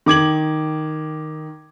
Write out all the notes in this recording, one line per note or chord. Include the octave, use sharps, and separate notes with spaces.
D#3 D6 G#6 F#7